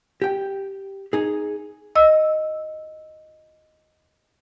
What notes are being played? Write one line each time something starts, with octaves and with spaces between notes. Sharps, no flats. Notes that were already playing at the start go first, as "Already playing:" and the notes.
G4 G5
D#4 G#4
D#5 E6